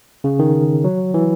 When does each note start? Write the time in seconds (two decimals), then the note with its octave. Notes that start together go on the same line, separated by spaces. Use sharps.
0.24 C#3
0.39 D#3
0.84 F#3
1.14 E3